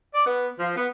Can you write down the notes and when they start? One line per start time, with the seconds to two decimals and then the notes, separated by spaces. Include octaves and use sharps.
0.15 D5
0.27 B3
0.60 F3
0.77 B3